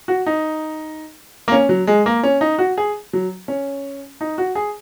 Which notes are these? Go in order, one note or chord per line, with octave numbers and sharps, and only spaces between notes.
F#4
D#4
A#3
C#4
F#3
G#3
A#3
C#4
D#4
F#4
G#4
F#3
C#4
D#4
F#4
G#4